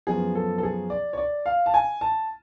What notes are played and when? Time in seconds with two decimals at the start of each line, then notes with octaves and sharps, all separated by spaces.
0.07 F#2 F3 B3 G#4
0.35 A4
0.58 A4
0.63 G#4
0.90 D5
1.13 C#5
1.18 D5
1.46 F5
1.66 A5
1.74 G#5
2.01 A5